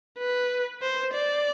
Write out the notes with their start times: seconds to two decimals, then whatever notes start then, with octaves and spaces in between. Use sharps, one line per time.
0.18 B4
0.82 C5
1.13 D5